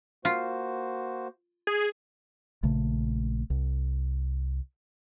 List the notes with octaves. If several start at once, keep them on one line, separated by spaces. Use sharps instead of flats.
A#3 F4 F#4 C5
G#4
A#1 C#3 A3
C2